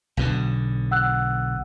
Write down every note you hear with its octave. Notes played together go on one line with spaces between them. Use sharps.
B1 B2 D3
F#5 E6 F#6